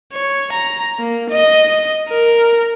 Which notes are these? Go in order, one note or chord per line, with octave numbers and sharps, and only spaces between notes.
C#5
A#5
A#3
D#5
A#4